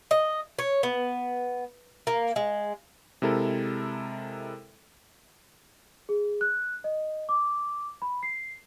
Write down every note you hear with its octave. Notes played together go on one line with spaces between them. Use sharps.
D#5
C#5
B3
A#3
G#3
C3 G#3 E4 A4 A#4
G#4
F#6
D#5
D6
B5
C7